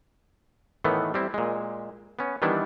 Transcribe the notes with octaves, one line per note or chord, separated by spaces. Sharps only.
A2 D#3 E3 A3 B3
G3 C4 E4
A#2 G#3
B3 C#4
D#3 E3 G3 B3 D4 E4